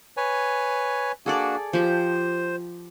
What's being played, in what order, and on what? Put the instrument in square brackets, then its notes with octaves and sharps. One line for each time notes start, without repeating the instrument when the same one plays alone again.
[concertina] B4 C#5 G#5
[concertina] A#3 D4 F#4 [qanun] G#4 A4 D5
[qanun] F3 G4 [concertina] C5